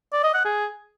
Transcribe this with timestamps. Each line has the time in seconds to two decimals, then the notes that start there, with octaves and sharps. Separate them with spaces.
0.13 D5
0.23 D#5
0.34 F#5
0.45 G#4